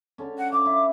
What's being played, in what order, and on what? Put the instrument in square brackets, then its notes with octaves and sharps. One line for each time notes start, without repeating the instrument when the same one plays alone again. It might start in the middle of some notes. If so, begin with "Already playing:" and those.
[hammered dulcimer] D3 C#4
[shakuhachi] F#5
[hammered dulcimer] F5 [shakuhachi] D6
[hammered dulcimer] E4